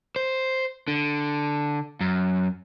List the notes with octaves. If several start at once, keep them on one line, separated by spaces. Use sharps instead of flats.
C5
D3
F#2